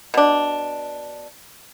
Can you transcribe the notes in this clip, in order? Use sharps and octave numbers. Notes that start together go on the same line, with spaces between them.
B2 D4